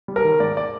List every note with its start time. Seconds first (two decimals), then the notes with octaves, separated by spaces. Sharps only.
0.08 G3
0.16 A#4
0.24 D#3
0.40 G#2 D5
0.57 D5